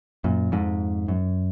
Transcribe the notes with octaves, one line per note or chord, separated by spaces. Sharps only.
F#2 A#2
F2 G#2
F#2